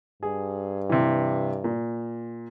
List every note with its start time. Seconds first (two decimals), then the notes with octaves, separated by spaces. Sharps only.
0.23 G2 G#4
0.90 C3 E3
1.64 A#2